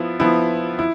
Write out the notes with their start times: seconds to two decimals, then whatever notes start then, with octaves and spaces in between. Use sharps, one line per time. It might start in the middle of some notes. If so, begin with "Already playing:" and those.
Already playing: F3 B3 E4
0.20 F3 B3 E4
0.79 E4